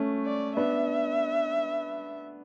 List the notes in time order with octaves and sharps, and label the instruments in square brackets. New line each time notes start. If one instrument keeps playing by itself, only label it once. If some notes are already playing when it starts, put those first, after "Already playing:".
Already playing: [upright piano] A3 C#4
[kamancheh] D5
[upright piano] B3 D4 [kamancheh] E5